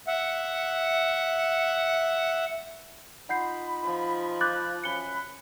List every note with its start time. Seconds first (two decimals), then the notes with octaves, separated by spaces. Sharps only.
0.07 E5 F#5
3.29 D#4 F4 F#5 B5 G6 C7
3.83 F3
4.41 D6 F#6 G6 A6
4.84 F#2 G#5 B5 C#7 G7